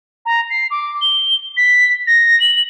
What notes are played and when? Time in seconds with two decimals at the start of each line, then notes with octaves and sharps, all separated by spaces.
0.25 A#5
0.50 C7
0.70 D6
1.01 G7
1.57 B6
2.07 A#6
2.40 F#7